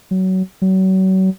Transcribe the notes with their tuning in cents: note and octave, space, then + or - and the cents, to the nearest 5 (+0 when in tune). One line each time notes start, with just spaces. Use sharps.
F#3 +20
F#3 +35